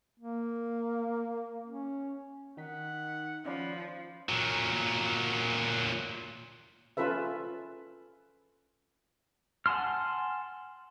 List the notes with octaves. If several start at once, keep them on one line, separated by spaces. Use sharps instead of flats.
A#3
C#4
D#3 D#4 F#5 B6
F3 C#4 D5 B5
A#2 F#3
C#4 F4 A4 B4 E5
F#5 G#5 A5 C6 F6